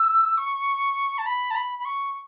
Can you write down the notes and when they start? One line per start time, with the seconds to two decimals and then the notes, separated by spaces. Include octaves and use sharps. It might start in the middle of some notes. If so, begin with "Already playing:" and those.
Already playing: E6
0.37 C#6
1.18 A5
1.26 B5
1.50 A5
1.55 B5
1.79 B5
1.85 C#6